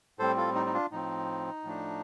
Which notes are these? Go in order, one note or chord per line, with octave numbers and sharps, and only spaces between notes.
A2 G3 C4 A4 C5
F4 A4
D#4
D#4
D4 F4
A2 F3 C4 D#4
A2 F3 A3 D4